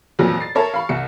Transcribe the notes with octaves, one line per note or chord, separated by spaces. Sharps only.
F2 A#2 E3 F#3
A6 C7
A4 A#4 C#5 E5 A5
F5 B5 C#6
C2 E5 C#7